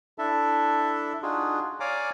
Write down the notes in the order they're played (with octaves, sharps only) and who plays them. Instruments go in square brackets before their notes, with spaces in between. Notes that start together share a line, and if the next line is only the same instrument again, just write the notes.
[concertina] D4 E4 A4 E5 A5
D4 D#4 F4 F#4 G#4
C#5 D5 F5 G#5 A#5 D6